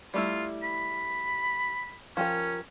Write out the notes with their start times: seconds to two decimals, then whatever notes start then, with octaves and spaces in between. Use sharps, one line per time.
0.14 G3 A3 E4 F4
0.63 B5
2.17 F3 C#4 G4 A#4